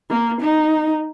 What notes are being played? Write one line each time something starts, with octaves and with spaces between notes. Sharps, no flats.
A#3
D#4